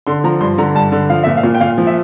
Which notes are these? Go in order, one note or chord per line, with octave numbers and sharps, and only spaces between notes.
D3 C6
F3 A#5
G2 C6
D3 A#5
G2 A5
D3
F3 F5
A#2 E5
F5
A#2
G5
A#2 F5
F3
E5